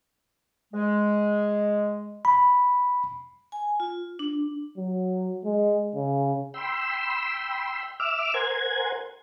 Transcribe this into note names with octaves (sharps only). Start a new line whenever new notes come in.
G#3
B5
G#5
F4
D4
F#3
G#3
C#3
G5 B5 C6 E6
E5 D6 E6 F6
A#4 C5 F#5 G#5 G#6